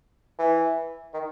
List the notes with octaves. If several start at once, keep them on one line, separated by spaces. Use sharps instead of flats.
E3
D#3